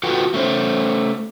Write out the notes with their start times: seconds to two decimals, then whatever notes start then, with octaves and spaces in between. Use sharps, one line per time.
0.03 F4 F#4 A4 B4 F#5 G5
0.34 A3 C#4 C5